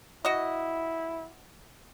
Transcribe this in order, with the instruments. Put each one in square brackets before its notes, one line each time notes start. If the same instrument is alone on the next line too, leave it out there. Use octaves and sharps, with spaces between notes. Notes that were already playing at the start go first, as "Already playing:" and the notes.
[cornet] E4 [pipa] F#4 D#5